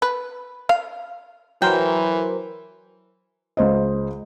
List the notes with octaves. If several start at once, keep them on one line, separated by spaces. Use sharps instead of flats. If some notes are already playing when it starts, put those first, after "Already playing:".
B4
F5
E3 F#3 A#4 C5 G5
C#2 C5 D#5